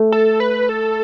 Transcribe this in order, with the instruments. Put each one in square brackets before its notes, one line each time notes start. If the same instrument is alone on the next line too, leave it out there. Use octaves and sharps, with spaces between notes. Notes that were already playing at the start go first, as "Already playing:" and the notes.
Already playing: [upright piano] A3
[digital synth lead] A4
B4
A4